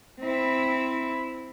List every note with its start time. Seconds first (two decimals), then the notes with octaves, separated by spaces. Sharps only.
0.21 C4 E4